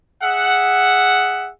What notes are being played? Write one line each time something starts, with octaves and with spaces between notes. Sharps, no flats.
G#4 E5 F#5